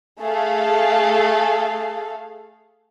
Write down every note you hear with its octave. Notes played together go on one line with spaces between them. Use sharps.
A3 G#4 A4 F5